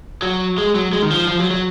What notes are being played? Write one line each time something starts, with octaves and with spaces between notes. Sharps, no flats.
F#3
G#3
F#3
G#3
D#3
F3
F3
F#3
F#3